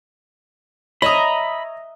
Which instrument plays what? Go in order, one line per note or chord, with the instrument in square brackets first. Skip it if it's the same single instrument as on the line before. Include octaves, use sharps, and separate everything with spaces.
[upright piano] C#5 D#6 [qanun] D#5 E5 A#5 [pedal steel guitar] B5